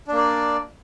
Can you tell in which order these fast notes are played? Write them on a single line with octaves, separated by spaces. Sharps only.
D4 A#3 D5